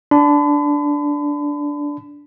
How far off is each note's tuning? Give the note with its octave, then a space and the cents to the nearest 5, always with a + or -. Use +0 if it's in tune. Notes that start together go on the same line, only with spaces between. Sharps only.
D4 -10 B5 +40